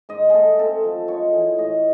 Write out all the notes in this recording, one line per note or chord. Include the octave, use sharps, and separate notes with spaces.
G#2 D#5
A3 G#4 A4
C4 A4
F3
G#3 C#5
E3
A2 D#5